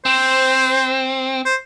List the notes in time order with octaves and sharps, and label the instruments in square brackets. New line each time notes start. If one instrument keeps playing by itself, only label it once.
[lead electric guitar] C4 [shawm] C5
[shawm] C5